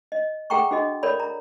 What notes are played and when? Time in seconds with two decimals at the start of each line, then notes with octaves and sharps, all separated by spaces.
0.12 D#5
0.50 G#4 A4 F#5 G5 A#5 C#6
0.71 D4 F#4 G#4 A4 D#5
1.03 A4 A#4 C#5 D5 B5
1.20 A#5